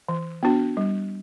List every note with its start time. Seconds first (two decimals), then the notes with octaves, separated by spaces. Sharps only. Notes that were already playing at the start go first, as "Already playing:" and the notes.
0.09 E3
0.43 B3 D4 F#4
0.77 G3